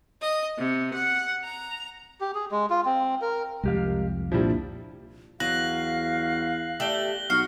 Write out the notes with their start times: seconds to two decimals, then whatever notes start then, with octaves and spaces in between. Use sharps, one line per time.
0.21 D#5
0.57 C3
0.93 F#5
1.43 A#5
2.20 G4
2.35 G#4
2.52 G#3
2.70 F4
2.85 C4
3.22 A#4
3.63 C2 F2 G#3 G4 F5
4.32 A#2 F3 G3 D4 E4
5.40 E2 F#3 F5 F#6 A#6 F#7
6.80 A3 G4 D5 F#7 G7
7.30 B1 F#4 F6 C7